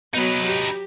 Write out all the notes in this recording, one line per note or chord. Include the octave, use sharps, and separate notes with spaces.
F#3 B3 D#4 B4
G4